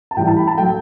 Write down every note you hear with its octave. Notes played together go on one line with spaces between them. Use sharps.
A5
A2 E3 G3 G5
A5
B5
A5
F#3 A3 G5